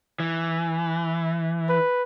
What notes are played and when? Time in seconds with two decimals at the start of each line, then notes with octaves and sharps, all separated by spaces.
0.20 E3
1.69 B4